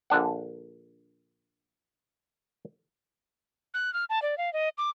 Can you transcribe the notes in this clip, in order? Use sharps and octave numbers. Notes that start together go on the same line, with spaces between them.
A#1 D3 D4 F#5
F#6
F6
A5
D5
F5
D#5
D6